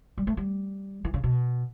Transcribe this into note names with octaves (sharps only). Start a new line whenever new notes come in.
G3
A3
G3
E3
C#3
B2